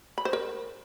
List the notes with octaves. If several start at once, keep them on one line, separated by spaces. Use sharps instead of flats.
B5
C5
A#4